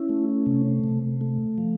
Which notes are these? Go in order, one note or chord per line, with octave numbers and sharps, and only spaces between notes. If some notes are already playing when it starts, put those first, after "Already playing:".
Already playing: C#4 E4
A3
C3
C3
A3
F3